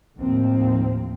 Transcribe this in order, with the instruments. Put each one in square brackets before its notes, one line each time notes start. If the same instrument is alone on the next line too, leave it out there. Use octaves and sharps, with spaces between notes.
[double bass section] D#2 A2 F3 A#3 C4